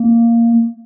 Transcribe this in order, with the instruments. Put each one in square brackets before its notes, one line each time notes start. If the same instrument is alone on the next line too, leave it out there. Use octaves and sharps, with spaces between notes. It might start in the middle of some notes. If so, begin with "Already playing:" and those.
Already playing: [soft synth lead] A#3